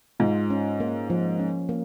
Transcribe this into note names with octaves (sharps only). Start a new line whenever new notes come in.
G#2 F4
C#4
A#3
F3
C#4
A#3